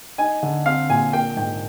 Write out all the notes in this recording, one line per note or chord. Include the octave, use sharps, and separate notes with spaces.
D#4 G#5
D3
C4 F5
A#2 G#5
A#3 G5
G#2 G5